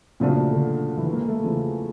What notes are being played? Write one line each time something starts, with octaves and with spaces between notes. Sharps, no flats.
A#2 C#3 F3 A3 D4 F#4
D3
E3
A#3
A3
E2 C#3 F3